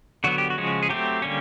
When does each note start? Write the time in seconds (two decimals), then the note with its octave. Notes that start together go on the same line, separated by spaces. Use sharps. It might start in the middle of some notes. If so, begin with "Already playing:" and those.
0.24 D3 F#3 B3 F#4
0.38 G4
0.50 F#4
0.57 C#3 F3 G#3 C#4
0.83 G#4
0.89 F#3 A3 C4 G4
1.22 D3 G3 A#3 C#4